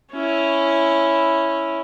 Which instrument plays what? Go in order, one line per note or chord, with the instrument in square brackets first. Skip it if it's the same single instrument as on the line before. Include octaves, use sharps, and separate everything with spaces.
[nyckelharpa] C#4 E4